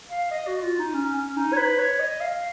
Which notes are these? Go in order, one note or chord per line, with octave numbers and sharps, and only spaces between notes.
F5
D#5
F#4
F4
D#4
C#4
C#4
D#4
C#5
B4
C#5
D#5
F5